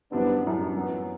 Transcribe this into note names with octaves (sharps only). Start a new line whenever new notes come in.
F#2 E3 G3 B3 C4 D4
F#2 E3 G3 C4
F#2 F#3 B3